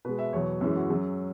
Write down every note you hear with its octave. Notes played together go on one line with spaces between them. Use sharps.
B2 G#3 B4
E5
E2 B2 F#3 C#5
F#2 E3 G#3 C#4
F#4
F#2 F#3 G#4